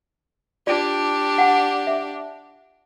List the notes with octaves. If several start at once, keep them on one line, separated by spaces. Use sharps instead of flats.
D4 F4 G4 D5
F#5 G5
E5